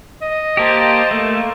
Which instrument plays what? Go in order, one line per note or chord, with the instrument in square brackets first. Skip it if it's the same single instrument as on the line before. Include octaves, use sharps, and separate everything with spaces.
[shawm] D#5
[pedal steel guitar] A#3 G4 [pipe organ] C5 A5
[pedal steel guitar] A3 [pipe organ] A#3